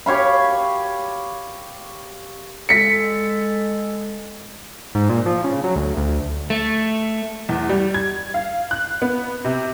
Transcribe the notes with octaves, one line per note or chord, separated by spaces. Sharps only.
G4 C#5 F5 B5
G#3 A4 B6 C#7
G#2
A#2
F3
C#3
F#3
D2
D2
A3
E2
G3
G#6
F5
F#6
B3
C3